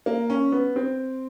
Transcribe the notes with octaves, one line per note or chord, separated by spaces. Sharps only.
A#3
C#4
B3
C4